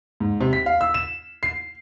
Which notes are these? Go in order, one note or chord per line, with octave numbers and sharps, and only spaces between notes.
G#2
C3
B6
F5
E6
E7
C7